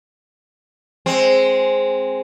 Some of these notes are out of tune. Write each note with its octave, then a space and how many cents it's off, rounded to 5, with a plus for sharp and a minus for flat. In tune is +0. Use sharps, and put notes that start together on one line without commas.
G#3 -5 C4 +5